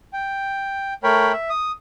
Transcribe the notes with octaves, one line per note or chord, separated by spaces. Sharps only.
G5
A3 A#4 C#5 G5 B5
E5
D#6